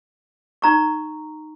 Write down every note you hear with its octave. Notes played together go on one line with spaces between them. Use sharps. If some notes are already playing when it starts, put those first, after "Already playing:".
D#4 A#5 C#6